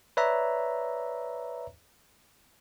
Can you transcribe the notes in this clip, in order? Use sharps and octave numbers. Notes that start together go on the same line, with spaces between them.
B4 C#5 D5 E5 A#5